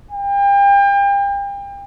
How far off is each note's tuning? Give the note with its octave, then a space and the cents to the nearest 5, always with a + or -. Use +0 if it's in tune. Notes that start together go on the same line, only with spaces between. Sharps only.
G5 +35